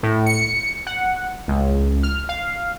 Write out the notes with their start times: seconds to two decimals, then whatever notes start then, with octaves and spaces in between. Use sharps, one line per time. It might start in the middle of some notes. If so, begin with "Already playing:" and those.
0.03 A2
0.26 C#7
0.87 F#5
1.48 C#2
2.03 F6
2.29 F5